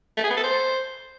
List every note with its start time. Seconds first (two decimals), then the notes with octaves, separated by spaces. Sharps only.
0.17 A3
0.24 G#4
0.30 B3
0.37 A4
0.44 C5